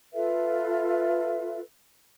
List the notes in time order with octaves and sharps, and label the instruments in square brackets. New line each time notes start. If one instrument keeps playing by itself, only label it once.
[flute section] F4 A4 B4 E5